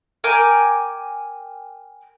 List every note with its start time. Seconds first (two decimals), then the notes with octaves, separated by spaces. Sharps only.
0.24 A#4 G5 G#5 D6